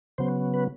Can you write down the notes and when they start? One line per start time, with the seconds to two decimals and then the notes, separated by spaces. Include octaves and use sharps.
0.18 C#3 F#3 B3 C5
0.54 B4